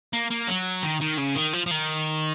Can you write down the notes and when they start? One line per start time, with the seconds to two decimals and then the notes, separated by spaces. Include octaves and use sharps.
0.13 A#3
0.31 A#3
0.48 F#3
0.83 D#3
1.01 D#3
1.18 C#3
1.36 D#3
1.53 F3
1.66 F3
1.71 D#3